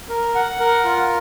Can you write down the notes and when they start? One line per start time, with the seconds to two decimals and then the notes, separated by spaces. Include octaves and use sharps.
0.09 A#4
0.35 F#5
0.60 A#4
0.85 F4